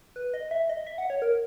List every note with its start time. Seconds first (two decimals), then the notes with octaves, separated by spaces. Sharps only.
0.16 B4
0.34 D#5
0.51 E5
0.69 D#5
0.87 E5
0.98 F#5
1.10 C#5
1.22 A#4